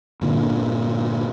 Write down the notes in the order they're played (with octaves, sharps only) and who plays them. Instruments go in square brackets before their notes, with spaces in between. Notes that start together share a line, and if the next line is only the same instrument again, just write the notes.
[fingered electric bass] G1 A#2 D3